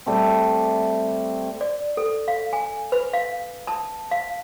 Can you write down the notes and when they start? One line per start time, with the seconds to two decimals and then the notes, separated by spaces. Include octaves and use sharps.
0.06 G3 A3 C4
1.61 D5
1.97 A4
2.28 F5
2.53 G#5
2.92 B4
3.13 F5
3.67 A5
4.11 F5